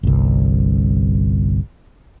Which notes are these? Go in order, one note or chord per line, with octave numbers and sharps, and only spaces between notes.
G1 C2